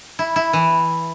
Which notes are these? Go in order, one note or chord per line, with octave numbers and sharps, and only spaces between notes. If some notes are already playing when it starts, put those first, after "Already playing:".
E4
E4
E3